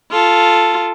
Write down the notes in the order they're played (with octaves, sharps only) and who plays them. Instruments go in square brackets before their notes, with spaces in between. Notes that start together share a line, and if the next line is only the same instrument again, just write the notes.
[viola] F4 A4